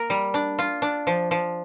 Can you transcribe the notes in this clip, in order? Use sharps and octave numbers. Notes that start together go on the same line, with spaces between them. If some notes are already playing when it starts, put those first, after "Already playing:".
Already playing: A#3 A#4
G3
D4
F4
D4
F3
F3